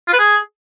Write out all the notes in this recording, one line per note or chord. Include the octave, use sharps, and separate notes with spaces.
F4
B4
G#4